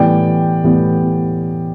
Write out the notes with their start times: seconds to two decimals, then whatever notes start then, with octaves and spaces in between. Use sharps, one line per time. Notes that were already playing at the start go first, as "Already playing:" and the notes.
Already playing: A2 E3 G3 B3 D5 G5
0.64 A2 E3 G3 B3